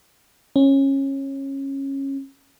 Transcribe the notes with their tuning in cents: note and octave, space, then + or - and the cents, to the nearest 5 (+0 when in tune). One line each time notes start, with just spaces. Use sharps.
C#4 -20